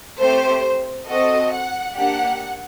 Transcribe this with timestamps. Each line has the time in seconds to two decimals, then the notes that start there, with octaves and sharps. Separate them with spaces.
0.20 A3 C4 G4 C5
1.09 C4 F#4 A4 D#5
1.52 F#5
1.96 A#3 D4 G4 F#5